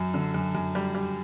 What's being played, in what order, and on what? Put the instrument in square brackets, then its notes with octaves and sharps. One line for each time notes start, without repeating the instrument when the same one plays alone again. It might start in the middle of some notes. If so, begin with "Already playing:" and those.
Already playing: [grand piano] F#2
D3
F#2
F#2
G3
G3